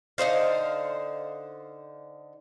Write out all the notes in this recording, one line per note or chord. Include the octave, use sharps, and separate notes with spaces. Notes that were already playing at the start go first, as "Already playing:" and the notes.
D3 D#4 C5 F5